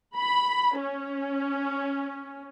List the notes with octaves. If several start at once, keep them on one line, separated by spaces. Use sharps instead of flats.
B5
C#4